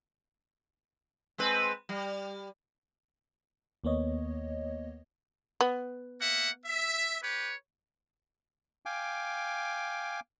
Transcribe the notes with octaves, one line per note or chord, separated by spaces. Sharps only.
G#3 C4 B4
G3
D#2 A#3 B3 C#5 D#5
B3
A#3 E5 F#5
E5
G4 B4 C#5
F5 G5 G#5 D6